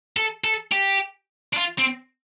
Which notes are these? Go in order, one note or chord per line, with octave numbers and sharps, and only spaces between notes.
A4
A4
G4
D4
F4
C4